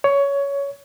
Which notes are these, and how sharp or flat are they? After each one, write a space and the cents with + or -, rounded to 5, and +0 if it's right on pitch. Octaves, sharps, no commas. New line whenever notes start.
C#5 +15